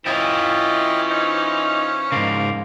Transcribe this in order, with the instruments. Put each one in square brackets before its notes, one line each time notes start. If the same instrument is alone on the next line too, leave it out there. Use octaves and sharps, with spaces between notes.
[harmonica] E3 C#4 C#5 [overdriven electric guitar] E4 F4 [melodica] D#5 G5
[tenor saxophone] D#4 [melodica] C5
[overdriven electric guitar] G#2 C#3 [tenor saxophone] A#3